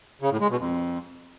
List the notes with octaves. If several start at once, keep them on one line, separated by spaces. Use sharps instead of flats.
C#3
A2
G#3
B2
F2